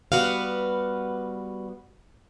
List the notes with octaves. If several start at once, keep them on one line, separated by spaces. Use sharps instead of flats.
G3 B3 F#4 B4 F5